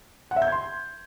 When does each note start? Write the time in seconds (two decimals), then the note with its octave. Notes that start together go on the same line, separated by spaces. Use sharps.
0.31 F#5
0.36 E5
0.42 G6
0.47 G#6
0.52 C6